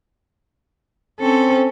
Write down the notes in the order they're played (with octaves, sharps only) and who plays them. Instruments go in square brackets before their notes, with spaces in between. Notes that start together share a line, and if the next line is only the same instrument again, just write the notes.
[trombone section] C4 [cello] C#4 A4